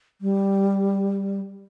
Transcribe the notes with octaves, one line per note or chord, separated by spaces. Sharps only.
G3